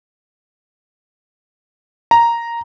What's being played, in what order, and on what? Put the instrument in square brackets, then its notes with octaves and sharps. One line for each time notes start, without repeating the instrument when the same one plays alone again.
[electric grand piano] A#5